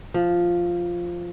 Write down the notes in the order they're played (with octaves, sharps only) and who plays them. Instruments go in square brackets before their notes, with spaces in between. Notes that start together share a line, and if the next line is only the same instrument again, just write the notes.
[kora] F3